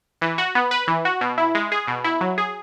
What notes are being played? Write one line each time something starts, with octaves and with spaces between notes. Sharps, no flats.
E3
F#4
B3
B4
E3
F#4
B2
E4
G#3
G#4
B2
E4
F#3
G#4